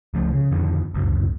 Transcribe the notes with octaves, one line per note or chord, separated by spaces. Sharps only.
C#2 F3 A3
C#3
F2 D3 D#3 F3
D1 G1 C#2 F#2